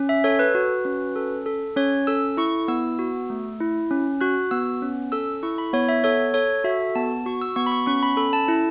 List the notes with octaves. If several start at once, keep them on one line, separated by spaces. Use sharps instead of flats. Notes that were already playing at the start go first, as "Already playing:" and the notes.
Already playing: C#4
E5
A4 C#5
B4
F#4
C#4
A4
A4
C#4 C#5
A4 E6
E4 C#6
B3 E6
F#4
A3
E4
C#4
F#4 F#6
B3 E6
C#4
A4 E6
E4 C#6
B5
B3 C#5
E5
A4 C#5
A4 C#5
F#4 E5
B3 A5
F#4 C#6
E6
B3 C#6
B5
C#6
C#4 C#6
B5
A4 B5
A5
E4